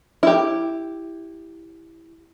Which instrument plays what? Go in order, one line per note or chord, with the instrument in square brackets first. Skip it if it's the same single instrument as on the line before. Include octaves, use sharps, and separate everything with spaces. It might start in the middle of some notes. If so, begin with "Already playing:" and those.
[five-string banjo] E4 G4